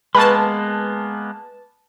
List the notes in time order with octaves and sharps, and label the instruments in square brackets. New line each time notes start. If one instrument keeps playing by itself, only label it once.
[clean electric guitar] G#3 A#3 B3 [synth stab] B4 A5 [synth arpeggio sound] B5 C#6